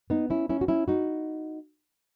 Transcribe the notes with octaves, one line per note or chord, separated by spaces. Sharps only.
B3 D#4
C#4 E4
C#4 E4
F#4
C#4 E4
D#4 F#4